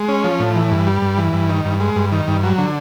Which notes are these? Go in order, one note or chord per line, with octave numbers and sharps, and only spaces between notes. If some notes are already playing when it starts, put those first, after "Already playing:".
Already playing: G#3
C#4
F3
A2
E3
G2
G3
G2
E3
G2
D#3
G2
G#3
G2
D#3
G2
F#3
D3